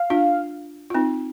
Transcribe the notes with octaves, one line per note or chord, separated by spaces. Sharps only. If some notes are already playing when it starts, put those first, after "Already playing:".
Already playing: F5
D4 F4
F4
C4 D#4